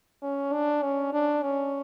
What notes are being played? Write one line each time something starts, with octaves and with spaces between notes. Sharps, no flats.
C#4
D4
C#4
D4
C#4